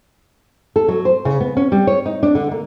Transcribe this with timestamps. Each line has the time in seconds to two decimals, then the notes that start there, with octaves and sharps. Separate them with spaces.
0.76 A4
0.88 F#3
1.05 C5
1.25 C#3
1.40 B3
1.57 C#4
1.72 G3
1.87 C#5
2.06 D#4
2.23 D4
2.35 D3
2.51 A#3